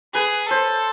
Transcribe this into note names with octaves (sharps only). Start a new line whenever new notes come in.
G#4 B4
A4 C5